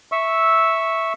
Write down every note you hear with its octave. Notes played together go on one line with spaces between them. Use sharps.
E5 C#6 E6